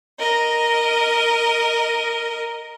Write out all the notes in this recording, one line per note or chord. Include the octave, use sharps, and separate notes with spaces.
A#4 D#5